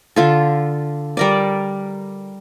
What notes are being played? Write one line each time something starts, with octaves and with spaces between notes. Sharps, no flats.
D3 F4 A4
G3 A#4 D5